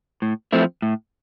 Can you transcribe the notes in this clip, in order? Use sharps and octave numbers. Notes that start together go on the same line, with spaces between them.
A2
F3 A3 C4 E4
A2